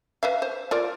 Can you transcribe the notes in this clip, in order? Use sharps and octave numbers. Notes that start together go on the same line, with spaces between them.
B4 E5 F5
C5
F4 A#4 D5